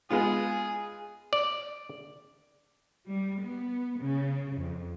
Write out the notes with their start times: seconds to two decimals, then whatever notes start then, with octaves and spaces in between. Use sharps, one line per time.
0.11 G#3 B3 F4 G#4
1.33 D5
3.07 G3
3.42 B3
3.99 C#3
4.59 F2